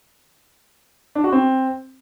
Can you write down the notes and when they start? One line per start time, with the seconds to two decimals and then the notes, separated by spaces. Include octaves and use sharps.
1.15 D4
1.24 F#4
1.32 C4